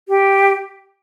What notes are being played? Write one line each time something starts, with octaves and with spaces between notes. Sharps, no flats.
G4